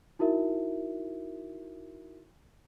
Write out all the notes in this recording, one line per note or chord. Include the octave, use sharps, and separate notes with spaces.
D#4 E4 F#4 A#4 E5